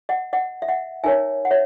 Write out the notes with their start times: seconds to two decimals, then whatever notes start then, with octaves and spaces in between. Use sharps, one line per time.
0.09 D#5 F#5
0.33 D#5 F#5
0.62 E5
0.68 D#5 F#5
1.04 D#4 A#4 C#5 E5 G#5
1.45 F#5
1.51 C#5 E5